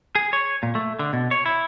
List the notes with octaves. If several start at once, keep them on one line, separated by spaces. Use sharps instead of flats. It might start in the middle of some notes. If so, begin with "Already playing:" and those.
G#4
C#5
A#2
A3
D3
B2
C#5
E4